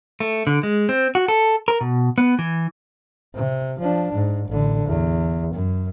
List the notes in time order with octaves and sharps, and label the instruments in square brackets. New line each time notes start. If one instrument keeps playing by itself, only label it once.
[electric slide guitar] A3
D3
G#3
C4
F#4
A4
A#4
B2
B3
E3
[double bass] C3
F3 D4
G#2
A1 D3
E2
F#2